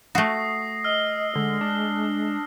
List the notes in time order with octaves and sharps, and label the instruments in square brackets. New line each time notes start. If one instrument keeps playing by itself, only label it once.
[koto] A3 F#4 [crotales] D#6 A#6 C7
[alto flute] D#5 [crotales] E6 F6 G7
[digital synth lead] D3 [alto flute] G#3
[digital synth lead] D4